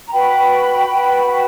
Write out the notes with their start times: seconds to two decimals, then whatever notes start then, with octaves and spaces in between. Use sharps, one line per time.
0.07 A#5
0.12 F#4 B4 G5 B5
0.89 F#4 B4